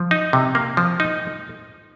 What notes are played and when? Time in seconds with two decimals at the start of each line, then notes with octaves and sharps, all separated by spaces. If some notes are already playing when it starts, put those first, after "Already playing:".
Already playing: F3
0.11 D#4
0.33 C3
0.55 A#3
0.77 F3
1.00 D#4